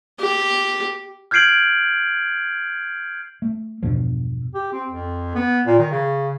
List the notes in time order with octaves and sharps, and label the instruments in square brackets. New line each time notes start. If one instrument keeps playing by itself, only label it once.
[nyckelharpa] G4
[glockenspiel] F6 G6 G#6 C7 D7 F#7
[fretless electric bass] A3
E2 G2 B2 F3
[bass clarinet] G4
C4
F2
B3
A#2
D#3
C#3